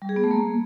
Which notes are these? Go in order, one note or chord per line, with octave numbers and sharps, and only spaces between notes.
G3
G#4
B3
A3
A#3